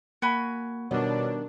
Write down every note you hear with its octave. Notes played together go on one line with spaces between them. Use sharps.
A#3 F#4 G#5 B5
B2 D#3 G3 B3 D4 C#5